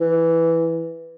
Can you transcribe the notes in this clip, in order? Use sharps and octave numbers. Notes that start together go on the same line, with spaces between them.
E3